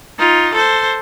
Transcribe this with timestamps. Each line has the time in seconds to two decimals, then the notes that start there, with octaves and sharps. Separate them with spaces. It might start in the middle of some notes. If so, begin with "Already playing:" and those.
0.18 D#4 F4
0.54 A4 C5